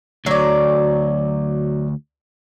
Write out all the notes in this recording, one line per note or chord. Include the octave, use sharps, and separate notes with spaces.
D2 F#3 D5